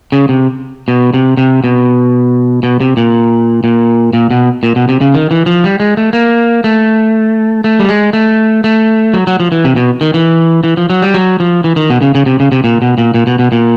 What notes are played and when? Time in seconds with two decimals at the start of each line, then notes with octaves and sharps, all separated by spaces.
0.12 C#3
0.29 C3
0.88 B2
1.14 C3
1.37 C3
1.64 B2
2.63 B2
2.80 C3
2.97 A#2
3.64 A#2
4.13 A#2
4.31 B2
4.63 A#2
4.76 B2
4.89 C3
5.01 C#3
5.14 D#3
5.31 E3
5.46 F3
5.64 G3
5.80 G#3
5.97 A3
6.13 A#3
6.64 A3
7.64 A3
7.79 G3
7.89 G#3
8.13 A3
8.64 A3
9.13 F#3
9.27 F#3
9.40 F3
9.52 E3
9.64 C3
9.76 B2
10.01 D#3
10.14 E3
10.64 E3
10.77 F3
10.90 F#3
11.02 G3
11.14 F#3
11.40 F3
11.64 E3
11.76 D#3
11.90 B2
12.01 C#3
12.15 C#3
12.26 C3
12.40 C#3
12.52 C3
12.64 A#2
12.82 B2
12.98 A#2
13.14 A#2
13.27 B2
13.39 B2
13.52 A#2